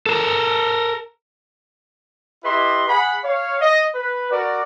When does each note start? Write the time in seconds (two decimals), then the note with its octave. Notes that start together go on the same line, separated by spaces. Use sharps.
0.06 A4 A#4
2.44 E4 G4 B4 D#5 C6
2.87 G#4 F#5 B5
3.22 C#5 F5
3.60 D#5
3.94 B4
4.31 F#4 A#4 D5